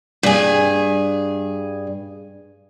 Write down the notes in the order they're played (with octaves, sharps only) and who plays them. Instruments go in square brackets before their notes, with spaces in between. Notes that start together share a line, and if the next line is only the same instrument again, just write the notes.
[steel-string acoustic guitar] G2 G#4